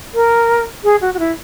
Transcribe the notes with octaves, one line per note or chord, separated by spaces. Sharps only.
A#4
G#4
F#4
F#4
E4